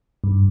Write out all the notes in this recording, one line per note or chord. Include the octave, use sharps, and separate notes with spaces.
G2